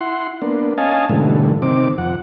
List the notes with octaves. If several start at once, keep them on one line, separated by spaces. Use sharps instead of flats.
E4 F#5 C6
A#3 B3 D4
C#4 D#5 F5 G#5 A5
G#2 B2 D3 E3 G3 A3
C3 D#3 C4 D6
F2 F#5